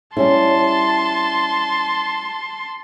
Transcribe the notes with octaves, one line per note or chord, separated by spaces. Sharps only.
G3 C#4 E4 A5 C6